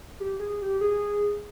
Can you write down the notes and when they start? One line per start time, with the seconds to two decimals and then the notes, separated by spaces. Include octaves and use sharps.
0.20 G4
0.40 G#4
0.61 G4
0.81 G#4